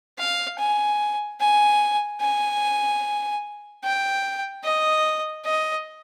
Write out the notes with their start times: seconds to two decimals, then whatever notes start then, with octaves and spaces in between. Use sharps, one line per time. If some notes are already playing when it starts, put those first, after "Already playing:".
0.19 F5
0.59 G#5
1.40 G#5
2.21 G#5
3.84 G5
4.64 D#5
5.45 D#5